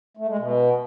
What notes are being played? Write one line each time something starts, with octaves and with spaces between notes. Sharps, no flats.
A3
G#3
B2